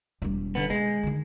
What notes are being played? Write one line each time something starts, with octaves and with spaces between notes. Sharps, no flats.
E1 G3
D3 B3
B2 G#3
D3 D#3